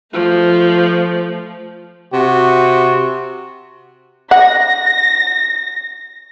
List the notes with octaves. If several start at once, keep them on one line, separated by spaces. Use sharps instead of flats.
F3 A3
C3 F#4
F#5 A#6